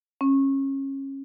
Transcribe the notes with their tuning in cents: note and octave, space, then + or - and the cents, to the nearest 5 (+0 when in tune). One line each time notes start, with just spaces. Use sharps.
C#4 -25